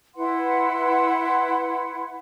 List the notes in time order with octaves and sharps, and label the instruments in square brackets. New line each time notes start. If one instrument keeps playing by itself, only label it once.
[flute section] E4 B4 F#5 C6